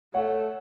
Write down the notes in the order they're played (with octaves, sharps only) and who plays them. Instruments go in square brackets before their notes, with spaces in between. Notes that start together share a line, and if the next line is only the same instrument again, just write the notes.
[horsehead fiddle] A3 [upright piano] C#5 F#5